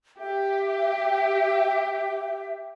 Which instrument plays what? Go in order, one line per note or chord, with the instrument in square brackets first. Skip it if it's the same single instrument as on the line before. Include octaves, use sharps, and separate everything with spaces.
[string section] G4 [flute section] E5